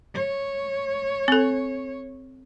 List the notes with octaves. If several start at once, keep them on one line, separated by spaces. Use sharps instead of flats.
C#5
C4 A4